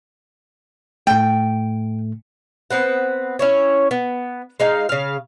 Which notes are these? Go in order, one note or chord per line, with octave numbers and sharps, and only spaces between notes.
A2 A3 G5
B3 C4 B4 F#5
C#4 E4 C#5
B3
G#3 D#4 F5
C#3 F5